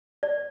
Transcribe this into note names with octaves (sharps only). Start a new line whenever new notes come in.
D5